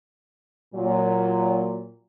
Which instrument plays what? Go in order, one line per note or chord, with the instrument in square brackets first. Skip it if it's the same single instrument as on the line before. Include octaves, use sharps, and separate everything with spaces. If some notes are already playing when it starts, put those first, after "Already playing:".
[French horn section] A#2 F#3